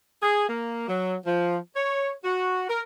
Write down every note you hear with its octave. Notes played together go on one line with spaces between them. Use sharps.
G#4
A#3
F#3
F3
C#5
F#4
A#4